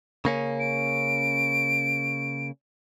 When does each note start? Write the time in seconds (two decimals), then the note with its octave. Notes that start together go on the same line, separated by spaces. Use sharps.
0.25 C#3 A#3 C#4
0.60 D7